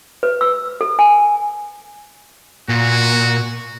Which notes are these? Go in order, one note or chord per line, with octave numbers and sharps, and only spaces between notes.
B4
E6
A4
G#5
A#2 F#4